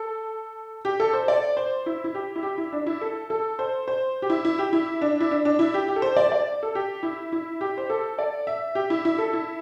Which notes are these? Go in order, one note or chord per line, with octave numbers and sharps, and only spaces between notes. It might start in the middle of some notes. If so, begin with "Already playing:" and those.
Already playing: A4
G4
A4
C5
D5
C5
E4
E4
G4
E4
G4
E4
D4
E4
A4
A4
C5
C5
G4
E4
E4
G4
E4
D4
E4
D4
D4
E4
G4
G4
A4
C5
D5
D5
A4
G4
E4
E4
G4
C5
A4
D5
E5
G4
E4
E4
A4
E4